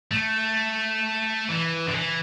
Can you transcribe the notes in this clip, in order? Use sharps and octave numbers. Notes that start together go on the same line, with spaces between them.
A3
E3
D3
E3